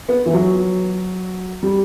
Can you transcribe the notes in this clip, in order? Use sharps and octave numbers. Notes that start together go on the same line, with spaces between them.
B3
E3
F#3
G3